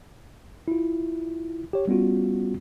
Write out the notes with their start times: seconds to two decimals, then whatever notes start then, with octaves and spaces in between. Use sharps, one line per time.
0.68 E4 F4
1.73 G4 C#5
1.88 G3 B3 C#4 F4 F#4